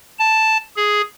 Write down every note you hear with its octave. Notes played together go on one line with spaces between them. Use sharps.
A5
G#4